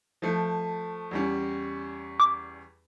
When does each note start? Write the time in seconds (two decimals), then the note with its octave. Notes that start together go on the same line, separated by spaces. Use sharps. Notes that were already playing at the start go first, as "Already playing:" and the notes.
0.22 F3 A3
1.11 E2 G3 C#4
2.20 D6